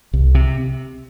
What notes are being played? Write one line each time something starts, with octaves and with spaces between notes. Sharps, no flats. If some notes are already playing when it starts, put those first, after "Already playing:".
C2
C3